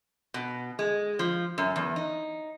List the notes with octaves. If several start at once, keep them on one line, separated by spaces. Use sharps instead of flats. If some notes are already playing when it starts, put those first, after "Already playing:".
B2
G#3
F3
F#2
E2
D#4